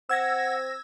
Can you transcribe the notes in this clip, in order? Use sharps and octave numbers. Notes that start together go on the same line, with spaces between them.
C4 F#5 E6 G#6 A#6